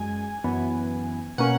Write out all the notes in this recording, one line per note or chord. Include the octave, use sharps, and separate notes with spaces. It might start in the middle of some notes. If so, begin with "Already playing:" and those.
Already playing: F#2 G#3 G#5
F#2 E3 B3
B2 A#3 C#4 F#5